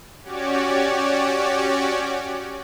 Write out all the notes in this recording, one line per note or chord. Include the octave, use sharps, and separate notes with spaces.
C#4 F#4 G4 C#5 D5